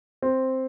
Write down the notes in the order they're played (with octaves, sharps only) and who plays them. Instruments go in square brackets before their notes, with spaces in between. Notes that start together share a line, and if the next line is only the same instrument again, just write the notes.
[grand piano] C4